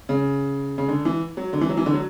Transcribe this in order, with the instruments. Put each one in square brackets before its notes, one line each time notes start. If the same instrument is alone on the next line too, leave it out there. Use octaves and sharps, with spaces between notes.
[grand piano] C#3
C#3
D3
E3
F#3
D3
E3
F#3
E3
D3
F#3